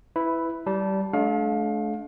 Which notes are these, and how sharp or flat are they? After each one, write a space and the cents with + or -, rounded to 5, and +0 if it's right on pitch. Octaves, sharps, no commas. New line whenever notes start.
E4 +0 B4 +15
G3 -20 A5 +0
A3 -40 D4 -20 F5 +25